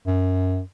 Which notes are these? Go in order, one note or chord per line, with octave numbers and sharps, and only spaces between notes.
F#2